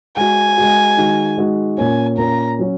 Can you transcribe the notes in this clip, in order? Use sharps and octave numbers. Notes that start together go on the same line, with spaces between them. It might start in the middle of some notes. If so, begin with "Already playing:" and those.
G#3 F#4 G#5
G#3 F#4
D#3 G#3 F#4
D#3 G#3 F#4
A#2 A#3 C#4 G#5
A#2 A#3 C#4 A#5
F#3 C#4 F#4